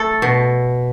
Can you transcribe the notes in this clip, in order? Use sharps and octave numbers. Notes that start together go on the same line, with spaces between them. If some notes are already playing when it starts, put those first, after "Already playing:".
Already playing: A3 A4
B2